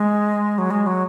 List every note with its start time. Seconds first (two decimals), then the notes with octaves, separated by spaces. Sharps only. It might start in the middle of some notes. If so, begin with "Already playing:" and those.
Already playing: G#3
0.58 F#3
0.70 G#3
0.86 F#3